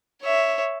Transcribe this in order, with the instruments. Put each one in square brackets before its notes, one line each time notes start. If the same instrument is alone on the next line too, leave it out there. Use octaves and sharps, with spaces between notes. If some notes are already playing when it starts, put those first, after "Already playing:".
[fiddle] C#5 E5